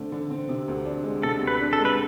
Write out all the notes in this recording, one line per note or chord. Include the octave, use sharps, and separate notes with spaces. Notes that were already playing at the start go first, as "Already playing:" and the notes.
Already playing: D3 A3 C4
D3
C4
C3
D2
D4
G#3
C3 A4
D2
B4
D4
A4
G#3
B4